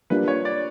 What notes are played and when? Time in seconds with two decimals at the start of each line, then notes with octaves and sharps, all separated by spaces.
0.10 G3 A#3 D4 F4 A#4 B4
0.28 C#5
0.45 D5